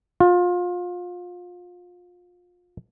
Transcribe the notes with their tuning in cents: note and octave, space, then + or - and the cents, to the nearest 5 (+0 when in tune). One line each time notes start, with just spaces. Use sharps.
F4 +25